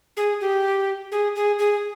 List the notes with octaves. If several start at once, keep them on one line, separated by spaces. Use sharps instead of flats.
G#4
G4
G#4
G#4
G#4